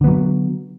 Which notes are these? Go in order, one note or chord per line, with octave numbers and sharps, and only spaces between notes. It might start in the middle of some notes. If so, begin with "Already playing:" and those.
D3 F#3 B3